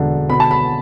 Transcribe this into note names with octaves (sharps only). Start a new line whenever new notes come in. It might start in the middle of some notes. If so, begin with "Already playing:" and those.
Already playing: E1 D3
B2 B5
A5
B5